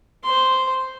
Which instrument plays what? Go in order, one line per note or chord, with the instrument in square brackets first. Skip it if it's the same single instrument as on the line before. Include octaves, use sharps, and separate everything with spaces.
[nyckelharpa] C5 C6